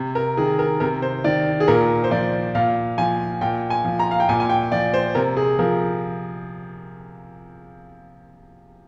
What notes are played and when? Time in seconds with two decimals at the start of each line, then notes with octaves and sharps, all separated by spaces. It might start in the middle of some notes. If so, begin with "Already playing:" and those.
Already playing: C3
0.15 A#4
0.37 D#3 G#4
0.59 A#4
0.80 C3 A#4
1.02 C5
1.24 D#3 D5
1.60 G#4
1.68 A#2 A#4
2.04 C5
2.11 F3 D5
2.55 A#2 F5
2.98 F3 G#5
3.41 A#2 G5
3.70 G#5
3.85 F3
3.99 A#5
4.11 F5
4.20 G5
4.29 A#2 G#5
4.40 G#5
4.49 G5
4.72 F3 D5
4.94 C5
5.15 C3 A#4
5.37 G#4
5.59 F3 A#4